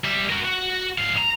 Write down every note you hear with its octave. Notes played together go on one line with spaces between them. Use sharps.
G3 E5
F#4 A#4
F#4
G#2 F5
A#5